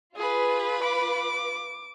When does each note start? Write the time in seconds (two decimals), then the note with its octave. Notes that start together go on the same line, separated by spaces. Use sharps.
0.16 F4 G#4 B4
0.83 D6